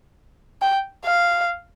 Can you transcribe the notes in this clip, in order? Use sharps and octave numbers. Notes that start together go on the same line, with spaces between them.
G5
F5